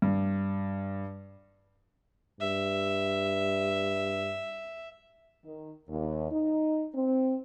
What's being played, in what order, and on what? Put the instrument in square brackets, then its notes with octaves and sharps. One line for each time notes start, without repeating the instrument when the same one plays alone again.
[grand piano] G2
[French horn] G2 [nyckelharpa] E5
[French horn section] D#3
D#2
D#4
C4